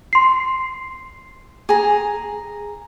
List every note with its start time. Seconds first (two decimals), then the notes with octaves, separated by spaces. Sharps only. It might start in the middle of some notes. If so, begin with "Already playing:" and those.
0.13 C6 C7
1.69 G#4 A#5